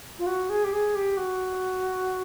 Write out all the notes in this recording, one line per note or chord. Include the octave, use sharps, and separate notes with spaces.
F4
F#4
G#4
G4
G#4
G4
F#4